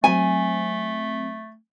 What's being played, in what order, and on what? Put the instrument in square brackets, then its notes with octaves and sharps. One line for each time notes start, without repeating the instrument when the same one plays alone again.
[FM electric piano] F#3 C4 [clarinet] A3 [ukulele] G#5